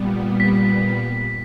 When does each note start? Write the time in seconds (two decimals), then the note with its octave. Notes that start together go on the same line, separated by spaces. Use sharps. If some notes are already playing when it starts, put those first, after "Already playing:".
Already playing: A#2 G3 B3
0.40 B6